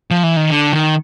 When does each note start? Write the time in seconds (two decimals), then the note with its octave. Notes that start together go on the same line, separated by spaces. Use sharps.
0.11 F3
0.23 E3
0.37 D#3
0.50 D3
0.73 D#3